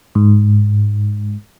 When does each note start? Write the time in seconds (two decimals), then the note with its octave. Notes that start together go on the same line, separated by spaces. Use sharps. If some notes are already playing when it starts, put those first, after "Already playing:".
0.15 G#2